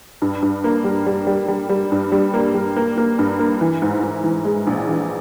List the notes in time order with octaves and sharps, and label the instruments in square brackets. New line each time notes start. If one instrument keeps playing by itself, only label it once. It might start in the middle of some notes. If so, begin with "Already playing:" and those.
[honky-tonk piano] G2
G2
A#3
G3
G3
G3
G3
G3
G2
G3
A#3
G3
A#3
A#3
G2
A#3
E3
G#2
G#2
E3
G#3
A#1
E3